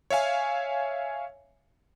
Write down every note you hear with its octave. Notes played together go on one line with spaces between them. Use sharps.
C#5 E5 F5 G#5